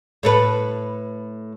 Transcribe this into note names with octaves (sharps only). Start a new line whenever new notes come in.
A2 A4 B4